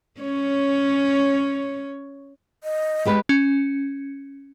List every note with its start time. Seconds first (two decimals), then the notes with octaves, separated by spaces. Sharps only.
0.21 C#4 C#5
2.64 D#5
3.05 G#3 G4 B4
3.29 C#4